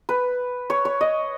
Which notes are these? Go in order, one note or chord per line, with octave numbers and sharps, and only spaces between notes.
B4
C#5
C#5
D#5